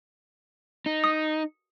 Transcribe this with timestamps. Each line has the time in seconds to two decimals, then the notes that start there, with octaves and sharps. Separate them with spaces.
0.86 D#4
1.04 D#6